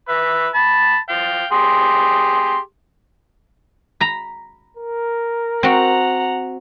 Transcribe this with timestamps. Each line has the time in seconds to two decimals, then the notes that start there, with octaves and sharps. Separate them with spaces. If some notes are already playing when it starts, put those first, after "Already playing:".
0.09 B4 E5
0.54 A5 B5
1.09 F5 G5
1.52 G4 G#4 C6
4.00 A#5 B5
4.77 A#4
5.63 C4 F#4 F#5 A#5